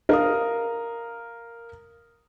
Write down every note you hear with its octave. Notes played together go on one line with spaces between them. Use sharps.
A#4 F5 D#6